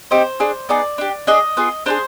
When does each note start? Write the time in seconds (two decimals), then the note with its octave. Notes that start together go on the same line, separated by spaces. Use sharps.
0.11 C4 D#4 G4 C5
0.40 D4 G#4
0.69 B3 D#4 G#4 D5
0.98 D4 G4
1.27 D4 G#4 D#5
1.57 B3 F4 G#4
1.86 D4 F4 G#4 C5